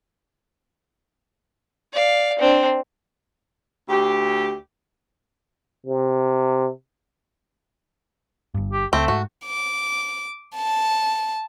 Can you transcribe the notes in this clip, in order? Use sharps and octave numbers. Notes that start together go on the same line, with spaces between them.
D5 F5
C4 D4
D2 G4
C3
G1 G2
G4
C#2 A3 C4
G#2 F#4
D6
A5